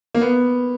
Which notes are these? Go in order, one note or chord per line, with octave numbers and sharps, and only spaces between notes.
A#3
B3